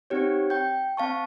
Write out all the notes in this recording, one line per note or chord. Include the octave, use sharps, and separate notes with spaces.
C4 D#4 G4 C#5
G5 G6
C4 F5 A5 C#6